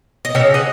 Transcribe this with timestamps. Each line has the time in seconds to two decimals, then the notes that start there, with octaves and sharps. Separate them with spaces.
0.25 D#5
0.35 C#3 C#5 E5
0.54 D#5 F#5